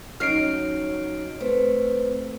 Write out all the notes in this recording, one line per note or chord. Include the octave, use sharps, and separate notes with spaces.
F#3 C#4 D#4 F6 C7 D7
A3 C4 B4 C5